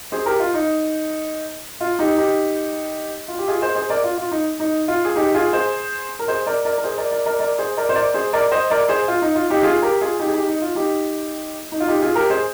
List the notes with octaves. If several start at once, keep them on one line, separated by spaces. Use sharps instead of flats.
G#4 C5
G4 A#4
F4
D#4
F4
D#4 G4
D#4 G4
F4
G4
F4 G#4
G#4 C5
G#4 C5
A#4 D5
F4
F4
D#4
D#4
F4
G#4
D#4 G4
F4 G#4
G#4 C5
A#4
G#4 C5
A#4 D5
A#4 D5
A#4
G#4 C5
A#4 D5
A#4 D5
A#4 D5
A#4 D5
G#4 C5
A#4 D5
C5
A#4 D5
G#4 C5
A#4 D5
C5 D#5
A#4 D5
G#4 C5
F4
D#4
F4
D#4 G4
F4 G#4
G4 A#4
F4 G#4
D#4 G4
G#4
D#4 G4
D#4
F4
D#4 G4
D#4
F4
D#4 G4
F4 G#4
G4 A#4
G#4 C5